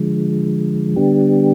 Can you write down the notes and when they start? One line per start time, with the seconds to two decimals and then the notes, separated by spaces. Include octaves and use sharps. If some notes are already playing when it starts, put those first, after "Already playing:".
Already playing: D3 F3 G#3
0.96 D3 G3 B3 D4 G4